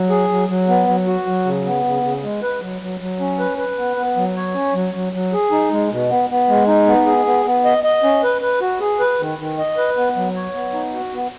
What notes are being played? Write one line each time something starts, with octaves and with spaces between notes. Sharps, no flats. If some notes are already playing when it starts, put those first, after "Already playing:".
Already playing: F#3
G#4
F#3
F#3
B3
F#3
F#4
F#3
C#3
B3
C#3
C#3
G#3
B4
F#3
F#3
F#3
C#4
B4
B4
B3
B3
F#3
C#5
C#4
F#3
F#3
F#3
G#4
D#4
G#3
B2
B3
B3
G#3
D#4
B3
G#4
B3
B3
D#5
D#5
C#4
B4
B4
F#4
G#4
B4
D#3
D#3
D#5
B4
B3
F#3
C#5
B3
D#4
F#4
B3